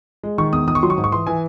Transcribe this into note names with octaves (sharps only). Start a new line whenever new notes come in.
G#3
D#3 C#6
E2 D#6
D#3 D#6
C#6
F#3 C6
C#6
G#2
C#6
E3 C6
E3 G#5